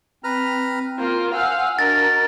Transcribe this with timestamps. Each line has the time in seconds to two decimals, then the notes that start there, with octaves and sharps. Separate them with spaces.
0.24 C4 B4 A#5 F6
0.98 A#3 F4 C5
1.33 C5 F5 F#5 G#5 E6
1.79 D4 F#4 A#4 D#5 A6